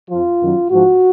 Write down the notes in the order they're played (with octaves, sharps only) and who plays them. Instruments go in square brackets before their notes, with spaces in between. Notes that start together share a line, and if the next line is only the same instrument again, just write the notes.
[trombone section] F2 F3 F4
F#2 D#3 F#3
G#2 F3 F#4